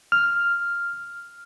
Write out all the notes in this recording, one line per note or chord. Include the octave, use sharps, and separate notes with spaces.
F6